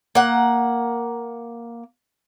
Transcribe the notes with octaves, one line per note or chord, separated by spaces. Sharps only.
A#3 F#5